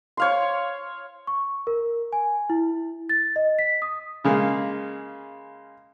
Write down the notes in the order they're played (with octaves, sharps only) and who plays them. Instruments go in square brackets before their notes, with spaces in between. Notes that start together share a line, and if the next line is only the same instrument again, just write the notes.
[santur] C#5 F5 C6
[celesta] C#6
A#4
G#5
E4
A6
D#5
B6
D#6
[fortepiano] C#3 G#3 A#3